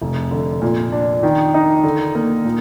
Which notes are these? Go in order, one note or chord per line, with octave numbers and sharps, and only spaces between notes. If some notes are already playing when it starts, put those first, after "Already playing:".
F1
D3
A#2
D4
D#3
D#4
D3
A#3
A#2